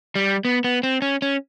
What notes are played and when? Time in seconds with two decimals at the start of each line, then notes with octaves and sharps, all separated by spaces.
0.15 G3
0.45 B3
0.64 B3
0.83 C4
1.02 C#4
1.22 C#4